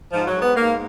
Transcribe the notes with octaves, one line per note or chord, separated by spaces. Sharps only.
G#2 F3
F#3
G#2
B3
G#2 A#3